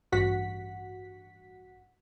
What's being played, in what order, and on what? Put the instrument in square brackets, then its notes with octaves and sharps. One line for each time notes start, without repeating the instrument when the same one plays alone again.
[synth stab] A1 G2 F#4 F#5 B6